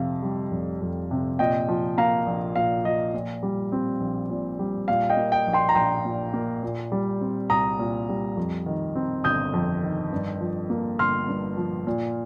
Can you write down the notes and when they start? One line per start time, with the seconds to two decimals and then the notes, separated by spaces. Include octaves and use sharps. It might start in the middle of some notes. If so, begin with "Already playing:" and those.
Already playing: F2 C3 F5
0.22 G3
0.52 F1
0.81 F2
1.11 C3
1.39 A#2 D#5 G5
1.68 F3
1.98 A#3 F5 A#5
2.26 A#1
2.56 A#2 F5
2.84 F3 D#5
3.14 A#2
3.43 G3
3.72 C4
4.01 A#1
4.30 A#2
4.59 G3
4.88 A#2 F5
5.10 D#5 G5
5.17 A#3
5.32 D#5 G5
5.47 A#1
5.53 G5 C6
5.69 A#5
5.75 A#1 G5 C6
6.05 A#2
6.34 A#3
6.63 A#2
6.92 G3
7.21 C4
7.50 C2 A#5 D#6
7.79 A#2
8.09 G3
8.37 F2
8.66 D#3
8.95 C4
9.24 G1 D#6 G6
9.53 F2
9.83 D#3
10.12 G2
10.40 F3
10.70 A#3
10.99 G1 C6 F6
11.28 G2
11.57 F3
11.87 A#2